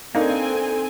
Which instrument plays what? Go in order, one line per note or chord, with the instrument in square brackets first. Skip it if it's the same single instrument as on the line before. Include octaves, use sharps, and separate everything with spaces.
[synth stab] A#3 [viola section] C4 G#5 [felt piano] D4 D#4 [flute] A4